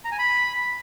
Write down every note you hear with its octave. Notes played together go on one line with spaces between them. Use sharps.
A#5
G#5
B5